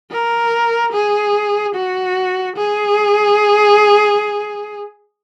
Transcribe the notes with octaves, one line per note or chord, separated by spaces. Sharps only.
A#4
G#4
F#4
G#4